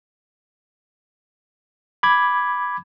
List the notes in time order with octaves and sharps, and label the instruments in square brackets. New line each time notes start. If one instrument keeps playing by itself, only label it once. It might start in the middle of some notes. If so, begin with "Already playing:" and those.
[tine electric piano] B5 D6 G#6